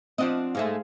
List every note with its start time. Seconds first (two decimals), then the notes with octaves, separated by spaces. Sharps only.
0.18 F3 C4 D4 F4 D#5 F#5
0.55 G#2 G#3 A3 G#4 C5 F5